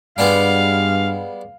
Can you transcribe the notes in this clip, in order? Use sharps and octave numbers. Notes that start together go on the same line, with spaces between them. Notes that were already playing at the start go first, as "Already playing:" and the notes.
G2 G3 G#3 B3 F5